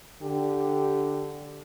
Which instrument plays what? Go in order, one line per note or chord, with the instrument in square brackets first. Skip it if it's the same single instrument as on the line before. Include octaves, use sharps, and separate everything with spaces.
[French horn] D3 [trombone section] G4